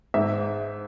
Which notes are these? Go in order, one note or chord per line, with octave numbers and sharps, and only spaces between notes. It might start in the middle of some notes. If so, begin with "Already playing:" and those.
G#2 E5